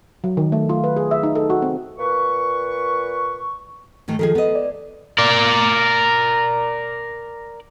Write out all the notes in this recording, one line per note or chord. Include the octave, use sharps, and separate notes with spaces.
F#3
D#3
A3
F4
B4
G#4
E5
D#4
A4
F#4
C4
A#2 B4 C#6
G#2 D#3 A3
D#3 F3 G#4 A4
B3 D#5
D5
A#4 D5